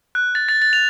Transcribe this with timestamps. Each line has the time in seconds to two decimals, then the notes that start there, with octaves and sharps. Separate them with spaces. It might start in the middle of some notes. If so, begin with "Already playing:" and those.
0.15 F#6
0.35 A6
0.49 A6
0.62 A6
0.73 F7